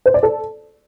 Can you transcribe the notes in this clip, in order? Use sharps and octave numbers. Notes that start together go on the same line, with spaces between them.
C5
D5
A4